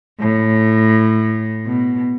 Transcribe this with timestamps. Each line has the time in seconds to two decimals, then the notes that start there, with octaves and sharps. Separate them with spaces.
0.19 A2
1.66 B2